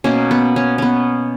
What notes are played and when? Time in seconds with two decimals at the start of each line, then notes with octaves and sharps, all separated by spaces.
0.04 B2 A#3 C#4
0.31 B3
0.56 C#4
0.78 B3 C#4